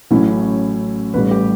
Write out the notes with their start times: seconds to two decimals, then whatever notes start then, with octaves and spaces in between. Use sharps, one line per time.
0.10 A1 A2 F#3 C#4 E4
1.14 A1 A2 G3 B4
1.31 G4